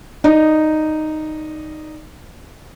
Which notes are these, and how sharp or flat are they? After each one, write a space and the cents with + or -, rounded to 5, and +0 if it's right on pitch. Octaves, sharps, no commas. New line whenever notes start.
D#4 -5 D5 +0